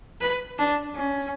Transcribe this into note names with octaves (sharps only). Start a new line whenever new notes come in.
B4
D4
C#4